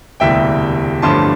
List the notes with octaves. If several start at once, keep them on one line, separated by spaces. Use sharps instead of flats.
E1 D2 C3 E3 G3 E5 G5
A1 G2 D3 F3 A3 A5 C6